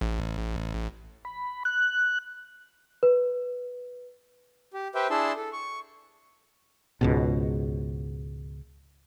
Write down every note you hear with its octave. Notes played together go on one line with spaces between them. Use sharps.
A1
B5
F#6
B4
G4
G4 B4 C5 E5 G5
D4 E4 G#4 A5 C6 E6
A4
C#6
C#2 G#2 B2